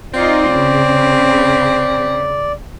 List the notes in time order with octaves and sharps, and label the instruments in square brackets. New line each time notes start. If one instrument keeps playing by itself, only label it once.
[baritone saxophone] C4 [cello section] D#4 F4 [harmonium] D5
[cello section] C#3